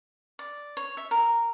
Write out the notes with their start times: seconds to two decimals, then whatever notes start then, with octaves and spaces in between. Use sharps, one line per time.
0.39 D5
0.77 C#5
0.97 E5
1.11 A#4